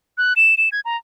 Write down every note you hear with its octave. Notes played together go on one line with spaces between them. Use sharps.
F#6
E7
E7
G#6
A#5